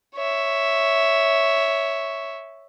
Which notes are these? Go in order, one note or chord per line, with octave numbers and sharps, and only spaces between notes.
C#5 E5